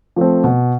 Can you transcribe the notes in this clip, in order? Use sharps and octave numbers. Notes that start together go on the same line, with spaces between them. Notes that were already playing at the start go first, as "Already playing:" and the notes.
F3 A3 C4
B2